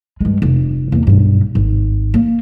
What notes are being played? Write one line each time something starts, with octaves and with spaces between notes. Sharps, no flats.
G2 G#3
F1
E2 A#3
B1 G2
G#1
A#3